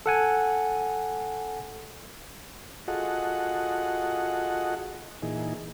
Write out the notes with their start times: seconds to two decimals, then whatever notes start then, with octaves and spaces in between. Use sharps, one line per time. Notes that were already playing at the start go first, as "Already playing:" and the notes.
0.06 A4 F#5 G#5
2.88 F4 F#4 G#4 A4 D#5 F#5
5.22 A#2 E3 D#4 G#4